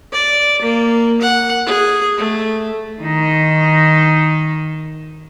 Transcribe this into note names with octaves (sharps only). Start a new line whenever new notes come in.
D5
A#3
F#5
G#4
A3
D#3 D#4